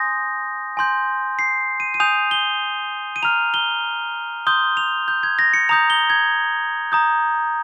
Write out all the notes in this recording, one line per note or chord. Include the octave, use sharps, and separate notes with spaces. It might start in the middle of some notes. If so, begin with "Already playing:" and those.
Already playing: G#5 C6 D#6 G6 A#6
G#5 C6 G6
C7
D#7
D#7
G#5 D#6 G6 F7
G7
D#7
A#5 F6 F7
G7
C6 D#6 G6 G7
F7
G6
G#6
A#6
C#7
A#5 D#6 G6 F7
G7
G#6
A#5 D#6 G6